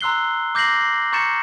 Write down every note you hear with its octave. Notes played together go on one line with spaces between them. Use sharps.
A#5 C6 E6 F#6 C7 G7
D6 G6 A#6 C7 F#7
C7
A#5 C#6 G6 A6 C#7 E7